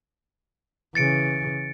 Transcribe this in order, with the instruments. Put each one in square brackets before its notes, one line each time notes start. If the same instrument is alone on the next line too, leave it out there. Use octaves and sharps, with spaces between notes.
[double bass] C#3 E3 [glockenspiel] A6 C#7 D7